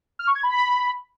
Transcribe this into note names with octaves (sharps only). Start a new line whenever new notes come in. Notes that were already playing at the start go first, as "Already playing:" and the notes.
F6
C#6
G#6
B5